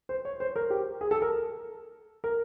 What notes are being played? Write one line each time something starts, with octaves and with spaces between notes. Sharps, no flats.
C5
C#5
C5
A#4
G4
G#4
A4
A#4
A#4